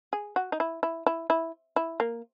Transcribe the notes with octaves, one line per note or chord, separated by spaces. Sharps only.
G#4
F#4
D#4
E4
E4
E4
E4
E4
A#3